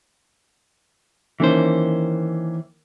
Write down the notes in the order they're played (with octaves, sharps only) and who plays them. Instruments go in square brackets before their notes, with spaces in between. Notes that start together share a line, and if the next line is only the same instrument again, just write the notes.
[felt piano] D#3 A#3 C#4 [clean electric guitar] E3 C5